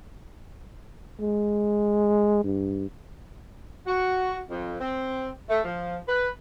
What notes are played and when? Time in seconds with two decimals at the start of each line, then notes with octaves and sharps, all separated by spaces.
1.20 G#3
2.44 G2
3.86 F#4
4.49 F2
4.80 C4
5.50 A3
5.64 F3
6.08 B4